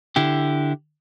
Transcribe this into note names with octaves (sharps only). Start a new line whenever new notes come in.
D3 E4 G4